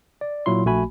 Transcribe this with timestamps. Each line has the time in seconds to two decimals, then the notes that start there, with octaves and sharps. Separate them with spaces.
0.21 D5
0.46 A#2 F#3 E4 C6
0.65 A#1 A3 F#4 G#5 B5